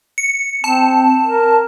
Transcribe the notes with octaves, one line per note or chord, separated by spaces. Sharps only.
C#7
C4 A5
A#4